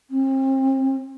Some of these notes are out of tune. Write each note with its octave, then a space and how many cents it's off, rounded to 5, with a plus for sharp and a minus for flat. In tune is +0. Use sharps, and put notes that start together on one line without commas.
C4 +35